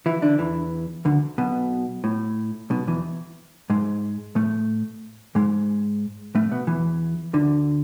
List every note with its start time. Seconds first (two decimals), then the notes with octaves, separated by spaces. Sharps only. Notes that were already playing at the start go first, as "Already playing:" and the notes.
0.06 E3 E4
0.22 D3 D4
0.39 E2 E3
1.05 D2 D3
1.38 B1 B2
2.04 A2
2.70 B1 B2
2.87 E2 E3
3.70 G#2 G#3
4.35 A2 A3
5.35 G#2 G#3
6.35 A2 A3
6.51 B2 B3
6.67 E2 E3
7.33 D2 D3